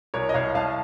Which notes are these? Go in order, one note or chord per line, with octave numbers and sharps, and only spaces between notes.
C2 A#4 C#5
D#5
C2 C#5 F5
C2 F5 A5